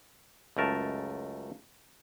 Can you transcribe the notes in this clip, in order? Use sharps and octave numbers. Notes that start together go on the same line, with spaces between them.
C#2 F#2 A3 A#4 A5